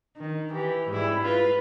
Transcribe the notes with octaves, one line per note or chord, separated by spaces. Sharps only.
D#3
E3 G4
G#2 G3 E4
F4 B4